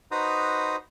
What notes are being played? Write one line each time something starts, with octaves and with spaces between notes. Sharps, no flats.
D#4 F#4 B4 C5 A#5 D#6